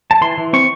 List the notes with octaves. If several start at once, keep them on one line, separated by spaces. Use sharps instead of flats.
A5
E3 C6
E3
C4 C#6